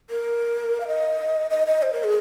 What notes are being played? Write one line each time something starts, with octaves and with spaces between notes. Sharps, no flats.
A#4
F5
D#5
D#5
D#5
C5
A#4
G#4